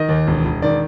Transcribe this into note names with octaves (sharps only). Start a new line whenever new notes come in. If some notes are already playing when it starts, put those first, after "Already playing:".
Already playing: D#3 D#5
D#2
E1
E1
D#3 D5